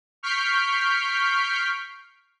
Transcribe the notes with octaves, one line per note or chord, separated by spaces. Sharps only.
C#6 F6 G6 B6 C7 D7